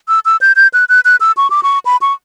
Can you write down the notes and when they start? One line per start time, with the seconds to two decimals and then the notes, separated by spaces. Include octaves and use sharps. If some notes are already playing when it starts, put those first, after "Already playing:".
0.08 E6
0.25 E6
0.41 G6
0.56 G6
0.74 F#6
0.89 F#6
1.05 F#6
1.20 E6
1.37 C#6
1.50 D6
1.63 C#6
1.86 B5
2.01 C#6